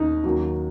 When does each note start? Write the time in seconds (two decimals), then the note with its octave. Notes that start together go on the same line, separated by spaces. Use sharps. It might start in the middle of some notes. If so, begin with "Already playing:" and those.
Already playing: D#2 D#3 D#4
0.24 D#2 D#3 F#3